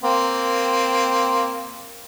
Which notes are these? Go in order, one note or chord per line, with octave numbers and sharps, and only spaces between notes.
A#3 C4